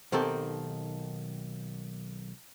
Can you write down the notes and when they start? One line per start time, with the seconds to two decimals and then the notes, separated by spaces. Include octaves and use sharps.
0.12 B1 D#3 A#3 C4 G4 A4